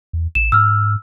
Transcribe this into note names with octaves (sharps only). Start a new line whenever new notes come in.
E2
A1 E7
G#2 E6 F6